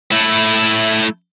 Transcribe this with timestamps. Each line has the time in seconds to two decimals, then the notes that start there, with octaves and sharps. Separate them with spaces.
0.12 A3 E4